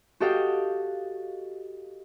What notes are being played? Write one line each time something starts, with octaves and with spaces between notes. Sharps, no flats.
F#4 G4 A4 D#5 F5 G5